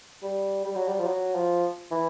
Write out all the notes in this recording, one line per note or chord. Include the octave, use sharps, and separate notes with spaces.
G3
G3
F#3
G3
F3
F#3
F3
E3